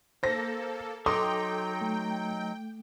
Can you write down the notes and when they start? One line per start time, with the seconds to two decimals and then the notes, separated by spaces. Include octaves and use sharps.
0.23 A#3 A4 C5 A#6
1.06 F#3 D#4 A4 G5 C6 D6 D#6
1.81 A3